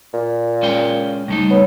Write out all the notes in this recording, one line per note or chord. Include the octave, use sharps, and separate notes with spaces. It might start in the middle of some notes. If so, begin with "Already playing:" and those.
A#2
G#3 C#4 G5
C#2 G3 A3 D#4
B3 C#5